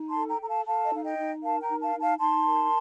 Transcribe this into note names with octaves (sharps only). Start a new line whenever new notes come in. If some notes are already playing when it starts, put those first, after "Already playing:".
Already playing: D#4
A5 C6
A4
G5 A#5
A4 A#5
F5 A5
A4 F5 A5
D#5
D#4 F5
D#5 G5
D#4
A#4 F5 A5
G5 A#5
D#4
F5 A5
D#4
F5 A5
D#4 A5 C6
A#4